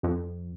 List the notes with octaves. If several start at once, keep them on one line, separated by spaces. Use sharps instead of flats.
F2